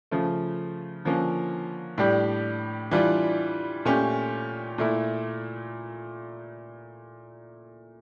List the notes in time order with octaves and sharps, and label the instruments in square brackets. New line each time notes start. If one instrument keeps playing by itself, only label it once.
[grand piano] C#3 F3 A3
D3 F3 A#3 C#4
A2 G3 D4 G4
E3 G3 D4 F4
A#2 A3 C#4 G4
A#2 A3 E4